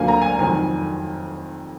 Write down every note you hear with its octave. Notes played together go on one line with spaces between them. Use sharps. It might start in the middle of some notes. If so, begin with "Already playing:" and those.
Already playing: D2 D3 F#3 A#3 F4 G#5
A#5
G#5
F1 F2 D#3 F#3 G#5